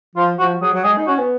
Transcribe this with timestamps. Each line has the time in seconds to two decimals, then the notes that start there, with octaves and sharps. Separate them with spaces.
0.15 F3 F4
0.39 F3 F#4
0.61 F#3 G#4
0.74 F#3
0.84 G#3 G#4
0.98 D#4
1.07 C#4 F#4
1.18 B3